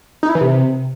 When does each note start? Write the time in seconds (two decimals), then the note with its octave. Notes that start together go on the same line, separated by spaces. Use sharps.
0.23 D#4
0.29 E4
0.35 E3
0.41 C3